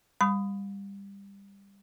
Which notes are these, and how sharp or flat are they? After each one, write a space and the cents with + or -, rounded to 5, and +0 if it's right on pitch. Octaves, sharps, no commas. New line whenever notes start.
G3 +20 B5 +25 D#6 +0